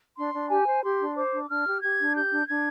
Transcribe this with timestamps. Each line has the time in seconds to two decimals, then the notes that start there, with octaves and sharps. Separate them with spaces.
0.17 D4 C6
0.34 D4
0.50 G4 G#5
0.67 C5
0.84 G4 C6
1.00 D4
1.16 C5 D6
1.33 D4
1.49 D4 F6
1.66 G4
1.82 G4 G#6
1.98 D4
2.15 G4 G6
2.31 D4
2.48 D4 G#6